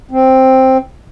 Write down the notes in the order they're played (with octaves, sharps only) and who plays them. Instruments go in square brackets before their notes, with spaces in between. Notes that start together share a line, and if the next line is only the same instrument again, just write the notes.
[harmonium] C4